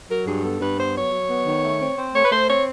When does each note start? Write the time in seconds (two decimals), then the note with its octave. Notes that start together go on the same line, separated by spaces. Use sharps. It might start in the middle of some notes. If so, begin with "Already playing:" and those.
0.09 F#3 A#4
0.26 G2 G#4
0.43 B3 A4
0.60 G2 B4
0.78 B3 C5
0.95 F#3 C#5
1.12 F#3
1.29 B3
1.46 D#3
1.64 A3
1.80 C4
1.97 C4
2.14 A3 C#5
2.25 B4
2.31 A3 C5
2.48 C4 C#5